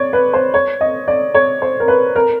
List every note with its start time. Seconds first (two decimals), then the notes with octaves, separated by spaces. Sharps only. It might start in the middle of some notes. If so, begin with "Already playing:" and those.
Already playing: C#5 D5
0.13 B4
0.33 C5
0.54 C#5
0.81 D#5
1.08 D5
1.34 C#5
1.62 C5
1.80 A#4
1.88 B4
2.16 A#4